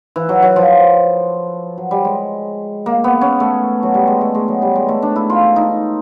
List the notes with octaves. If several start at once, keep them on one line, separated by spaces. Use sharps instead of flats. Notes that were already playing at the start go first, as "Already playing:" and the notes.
E3
F#3
F#3
F3
F#3
G3
G#3
A#3
B3
C#4
A3
F#3
G3
G#3
A3
G#3
F#3
G3
G#3
A3
D4
E4
F4
D#4